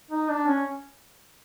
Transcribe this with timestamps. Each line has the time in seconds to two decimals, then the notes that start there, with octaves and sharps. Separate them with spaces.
0.11 D#4
0.29 D4
0.47 C#4